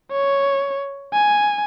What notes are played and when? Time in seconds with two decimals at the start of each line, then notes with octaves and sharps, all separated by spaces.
0.12 C#5
1.13 G#5